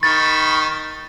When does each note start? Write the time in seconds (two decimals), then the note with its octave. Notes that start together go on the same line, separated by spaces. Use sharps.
0.03 D#3 B5 C#6 A6